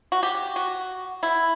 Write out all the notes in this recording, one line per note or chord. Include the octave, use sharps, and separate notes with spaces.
F#4
G4
F#4
E4